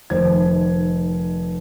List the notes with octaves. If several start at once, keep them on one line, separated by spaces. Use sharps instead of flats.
F1 D#3 C5 G#6